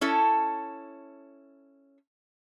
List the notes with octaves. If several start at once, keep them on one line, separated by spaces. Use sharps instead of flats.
C#4 E4 A4